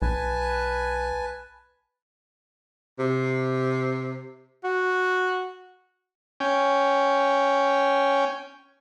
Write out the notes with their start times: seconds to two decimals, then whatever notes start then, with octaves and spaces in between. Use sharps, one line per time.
0.02 B1 B4 G#5 A5
2.99 C3
4.64 F#4
6.40 C#4 G5